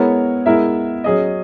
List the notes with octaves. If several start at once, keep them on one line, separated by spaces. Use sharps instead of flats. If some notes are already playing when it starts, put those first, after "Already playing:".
Already playing: G#3 B3 E4 A#4 C#5
G#3 B3 E4 A#4 E5
F#3 C#4 G#4 D#5